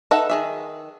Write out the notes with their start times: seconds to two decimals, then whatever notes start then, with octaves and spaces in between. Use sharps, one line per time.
0.11 D#4 A4 B4 E5 F#5
0.30 D#3 G#4 E5